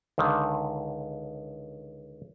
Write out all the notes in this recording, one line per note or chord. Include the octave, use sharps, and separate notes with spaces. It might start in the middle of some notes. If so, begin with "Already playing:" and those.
C#2 D3 D#3